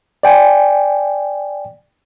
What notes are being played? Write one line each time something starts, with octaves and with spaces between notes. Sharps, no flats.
D5 G5 G#5